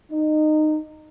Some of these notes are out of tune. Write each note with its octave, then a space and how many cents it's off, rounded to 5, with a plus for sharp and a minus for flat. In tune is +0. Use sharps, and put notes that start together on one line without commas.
D#4 -20